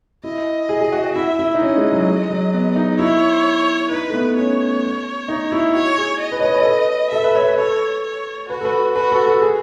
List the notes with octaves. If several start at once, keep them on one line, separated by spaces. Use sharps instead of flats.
E4 D#5
G#4
G#4
F#4
F#4
E4 E5
E4
D#4
C#4 D#5
G#3
F#3
G#3
F#3
B3
D#4
E4 C#5
D#4 B4
A3
B3
C#4 C#5
D#4
E4
F#4 C#5
G#4
D#5
B4
C#5
B4
C#5
A4
B4
A4 E5
B4
C#5
B4
A4 C#5
C#5
F#4 B4
A4
B4
F#4 B4
A4
A4
G#4